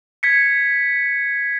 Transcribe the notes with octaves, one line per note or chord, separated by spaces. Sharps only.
G#6 B6 C#7